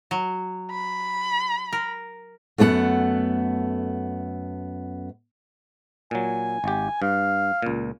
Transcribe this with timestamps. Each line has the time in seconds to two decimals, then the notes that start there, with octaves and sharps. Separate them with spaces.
0.11 F#3
0.71 B5
1.72 A#4
2.58 F#2 A3 B3 G4 F#5
6.11 A#2 F#3 G#5
6.64 G#1 G4
7.02 G2 F5
7.62 C#2 A#2